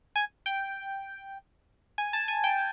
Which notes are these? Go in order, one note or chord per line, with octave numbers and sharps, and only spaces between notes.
G#5
G5
G#5
A5
G#5
G5